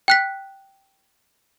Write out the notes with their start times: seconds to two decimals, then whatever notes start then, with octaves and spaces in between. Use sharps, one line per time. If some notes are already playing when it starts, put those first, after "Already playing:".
0.08 G5 F#6 B6